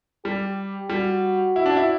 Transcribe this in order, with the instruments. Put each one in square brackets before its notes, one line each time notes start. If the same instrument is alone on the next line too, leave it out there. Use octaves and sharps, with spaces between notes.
[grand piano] G3 [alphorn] G4
[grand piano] G3 [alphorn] F#4
[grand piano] E4
D4
E4